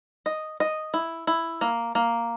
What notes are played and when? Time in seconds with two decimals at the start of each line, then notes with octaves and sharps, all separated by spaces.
0.26 D#5
0.60 D#5
0.94 E4
1.27 E4
1.61 A#3
1.95 A#3